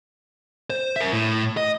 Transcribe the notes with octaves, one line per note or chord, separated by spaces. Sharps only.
C5
A#4 E5
A2
D#5